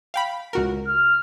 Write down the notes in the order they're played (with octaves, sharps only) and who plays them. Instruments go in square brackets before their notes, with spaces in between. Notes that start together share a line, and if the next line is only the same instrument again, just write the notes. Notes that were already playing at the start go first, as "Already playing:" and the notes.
[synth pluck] F5 G5 B5
C#2 F#4 A#4
[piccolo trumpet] F6